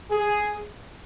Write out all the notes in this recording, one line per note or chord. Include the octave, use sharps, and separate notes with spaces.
G#4